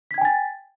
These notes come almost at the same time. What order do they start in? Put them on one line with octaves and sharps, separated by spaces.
B6 G#6 G5 G#5 A6